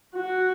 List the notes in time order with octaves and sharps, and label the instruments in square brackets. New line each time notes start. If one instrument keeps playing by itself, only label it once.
[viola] F#4